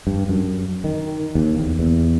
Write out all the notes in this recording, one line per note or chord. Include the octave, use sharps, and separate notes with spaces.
G2
F#2
D#3
D#2
E2
E2